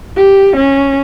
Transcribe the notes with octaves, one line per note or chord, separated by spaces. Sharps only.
G4
C#4